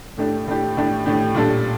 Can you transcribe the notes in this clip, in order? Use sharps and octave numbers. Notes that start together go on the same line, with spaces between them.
A2 A3 D4 G4
A2 A3 D4 G4
A2 A3 D4 G4
A2 A3 D4 G4
A#2 G3 D4 A4